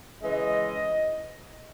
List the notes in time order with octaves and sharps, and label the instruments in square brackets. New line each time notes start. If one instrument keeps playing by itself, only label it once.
[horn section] C#3 E3 G#3 D#5